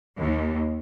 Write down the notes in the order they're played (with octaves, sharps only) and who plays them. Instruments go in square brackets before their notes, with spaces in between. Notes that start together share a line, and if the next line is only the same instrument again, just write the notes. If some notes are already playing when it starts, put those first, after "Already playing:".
[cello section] D#2